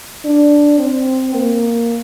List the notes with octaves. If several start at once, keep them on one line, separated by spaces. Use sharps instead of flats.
D4
C4
A#3